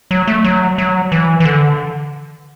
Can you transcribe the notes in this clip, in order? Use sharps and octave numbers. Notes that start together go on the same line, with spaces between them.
F#3
A3
F#3
F#3
E3
E3
D3